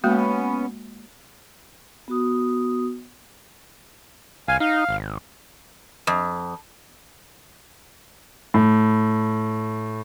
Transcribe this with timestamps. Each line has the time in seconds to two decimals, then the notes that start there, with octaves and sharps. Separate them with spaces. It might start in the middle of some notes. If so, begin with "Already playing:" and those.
0.04 G#3 A#3 B3 C#4 F#4
2.08 B3 F#4 D#6
4.48 C2 F5 G#5
4.60 D#4 F5
4.89 G#1
6.07 F2
8.54 A2